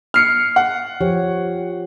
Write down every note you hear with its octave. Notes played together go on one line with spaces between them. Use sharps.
F6 C7 C#7
F#5
F3 G4 C#5